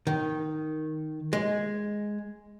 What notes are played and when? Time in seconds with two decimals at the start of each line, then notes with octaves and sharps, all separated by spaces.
0.07 D#3
1.33 G#3